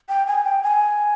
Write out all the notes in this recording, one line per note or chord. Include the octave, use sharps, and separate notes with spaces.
G5
G#5
G5
G#5